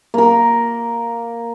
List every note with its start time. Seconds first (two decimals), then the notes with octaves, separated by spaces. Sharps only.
0.14 A#3 A#4